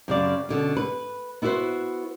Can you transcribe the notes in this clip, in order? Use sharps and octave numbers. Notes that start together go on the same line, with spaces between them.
F#2 C#3 D5
B2 D3 C#4
B4
B3 E4 F#4 A4 B4 C5